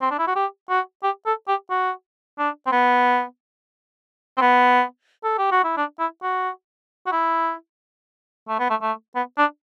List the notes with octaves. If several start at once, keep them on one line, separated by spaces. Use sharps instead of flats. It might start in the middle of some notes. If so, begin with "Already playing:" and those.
C4
D4
E4
F#4
G4
F#4
G4
A4
G4
F#4
D4
C4
B3
C4
B3
A4
G4
F#4
E4
D4
E4
F#4
F#4
E4
A3
B3
A3
A3
B3
D4